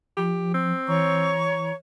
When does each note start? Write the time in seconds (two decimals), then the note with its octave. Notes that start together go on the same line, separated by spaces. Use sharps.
0.17 F3 G4
0.54 C4
0.88 E3 C#5 A#5 C#6